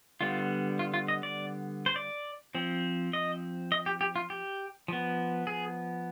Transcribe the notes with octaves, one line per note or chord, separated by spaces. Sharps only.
D3 G3 B3 F4
F4
F4
D#5
D5
C5
D5
F3 C4
D#5
D#5
G4
G4
F4
G4
F3 B3
G#4